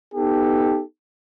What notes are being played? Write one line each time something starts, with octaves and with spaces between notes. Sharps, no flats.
B3 D#4 G4 A4